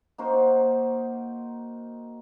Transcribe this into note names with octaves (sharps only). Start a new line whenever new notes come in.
A#3 D#4 F#4 C5